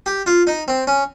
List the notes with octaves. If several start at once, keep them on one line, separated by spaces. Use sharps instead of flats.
G4
F4
D#4
C4
C#4